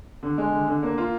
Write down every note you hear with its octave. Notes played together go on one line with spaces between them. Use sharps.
D3
G#3
D3
D3
A#3
F4